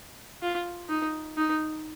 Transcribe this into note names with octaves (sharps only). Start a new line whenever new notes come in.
F4
D#4
D#4